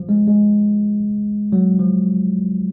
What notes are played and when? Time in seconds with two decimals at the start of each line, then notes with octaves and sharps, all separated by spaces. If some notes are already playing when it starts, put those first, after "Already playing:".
Already playing: F3
0.09 G#3
0.27 G#3
1.52 F#3
1.79 F3